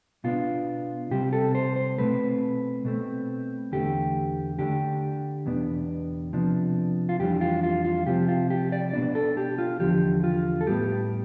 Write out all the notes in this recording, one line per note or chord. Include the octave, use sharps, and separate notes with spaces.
B2 B3 D4 F4
C3 G3 C4 G4
A4
C5
C5
B2 A3 C4 B4
B2 A3 C4
E2 D3 A3 G4
D3 A3 D4 G4
E2 B2 B3 D4
C3 F3 B3 D4
F4
F2 E3 G3 D4 G4
F4
F4
F4
C3 F3 C4 G4
F4
G4
D5
B2 B3 D4 D5
A4
G4
F4
E2 D3 F3 G4
F4
A4
A2 G3 B3 G4